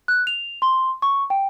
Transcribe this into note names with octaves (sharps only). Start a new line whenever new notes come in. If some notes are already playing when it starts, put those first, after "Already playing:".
F#6
F7
C6
C#6
G5